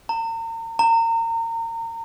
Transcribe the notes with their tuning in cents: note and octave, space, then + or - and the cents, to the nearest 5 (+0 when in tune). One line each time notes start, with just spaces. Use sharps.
A#5 -40
A#5 -30